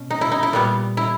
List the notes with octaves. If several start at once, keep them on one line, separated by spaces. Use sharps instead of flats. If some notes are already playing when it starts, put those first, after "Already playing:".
Already playing: B2 C#4
D#4
E4
D#4
E4
A#2 G3 B3
E4